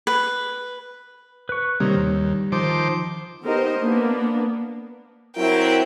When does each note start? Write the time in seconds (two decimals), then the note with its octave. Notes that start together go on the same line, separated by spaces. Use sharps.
0.07 B4
1.49 B4 C#6
1.80 C3 D#3 G3 A#3 C#5
1.96 D#2
2.52 D#3 F3 C5 D6
3.43 B3 D#4 G4 A#4 C5 D#5
3.79 A#3 B3 D4
5.37 F#3 C4 E4 A#4 G5